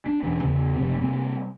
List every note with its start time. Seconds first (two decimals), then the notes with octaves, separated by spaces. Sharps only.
0.06 D4
0.23 E1 E3 C#4 D4
0.43 E2 C#3
0.76 F#1 C3 F3 C4
1.01 C3 G3 A#3 C4